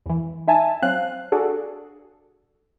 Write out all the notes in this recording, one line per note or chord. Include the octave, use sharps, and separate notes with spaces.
E2 E3
D#4 E5 G#5 A5
F#3 C4 F5 F#6
D4 F#4 G#4 A4